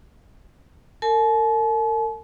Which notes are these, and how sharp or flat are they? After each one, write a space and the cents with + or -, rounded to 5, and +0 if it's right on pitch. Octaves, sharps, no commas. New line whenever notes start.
A#4 -40 A5 -45